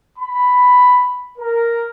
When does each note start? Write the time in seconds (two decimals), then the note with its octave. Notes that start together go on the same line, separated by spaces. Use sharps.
0.19 B5
1.39 A#4